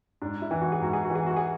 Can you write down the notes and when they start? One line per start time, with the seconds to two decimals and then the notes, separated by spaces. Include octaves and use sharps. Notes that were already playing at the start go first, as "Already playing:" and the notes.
0.22 G#2 D4
0.42 E4
0.51 E3
0.61 F#4
0.72 G#4
0.81 G#2 F#4
0.93 G#4
1.04 F#4
1.10 E3
1.15 G#4
1.26 F#4
1.36 G#4